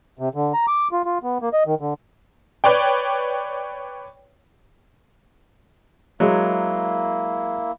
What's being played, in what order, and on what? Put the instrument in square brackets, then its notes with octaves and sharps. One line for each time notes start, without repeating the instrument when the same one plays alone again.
[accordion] C3
D3
A#5
D6
F4
F4
B3
A#3
D#5
D#3
D3
[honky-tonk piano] B4 C#5 D5 G5
[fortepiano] F#3 G#3 [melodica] A#3 E4